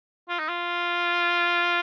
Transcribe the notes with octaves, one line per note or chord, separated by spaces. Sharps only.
F4
D#4
F4